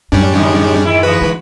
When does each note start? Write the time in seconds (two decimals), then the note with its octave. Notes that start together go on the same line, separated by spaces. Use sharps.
0.12 F#2 A2 G3 C#4 D4
0.33 D3 D#3 G#3
0.85 G#2 D#3 E4
1.03 D3 E3 F#4 B4
1.21 G#3